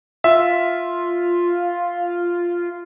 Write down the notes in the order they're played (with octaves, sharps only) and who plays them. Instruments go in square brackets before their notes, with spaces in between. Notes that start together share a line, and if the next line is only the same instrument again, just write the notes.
[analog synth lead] F4 [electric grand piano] E5